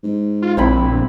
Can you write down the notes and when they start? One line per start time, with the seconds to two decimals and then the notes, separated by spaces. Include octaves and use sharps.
0.03 G#2
0.42 F4
0.57 A#1 C4 E4 B5
0.89 G1